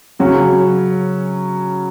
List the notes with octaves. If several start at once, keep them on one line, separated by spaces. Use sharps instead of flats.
C#3 F#3 C#4